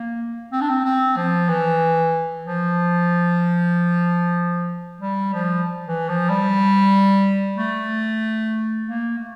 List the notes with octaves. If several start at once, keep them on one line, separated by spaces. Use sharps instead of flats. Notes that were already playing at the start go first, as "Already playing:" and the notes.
Already playing: A#3
C4
D4
C4
C4
F3
E3
F3
G3
F3
E3
F3
G3
A3
A#3
A3